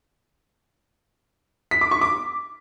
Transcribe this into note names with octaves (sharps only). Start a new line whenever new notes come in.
B6
D6
C#6
D6